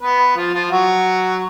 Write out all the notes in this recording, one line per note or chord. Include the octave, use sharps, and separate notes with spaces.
B3 B4
F3 F4
F3 F4
F#3 F#4